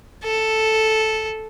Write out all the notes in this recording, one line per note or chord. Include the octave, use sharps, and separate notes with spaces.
A4